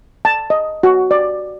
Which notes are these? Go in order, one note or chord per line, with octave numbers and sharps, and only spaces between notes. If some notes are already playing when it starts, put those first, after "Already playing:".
A5
D#5
F#4
D5